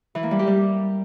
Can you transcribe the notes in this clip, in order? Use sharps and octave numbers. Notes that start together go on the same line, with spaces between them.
E3
A#3
G3
G4
G3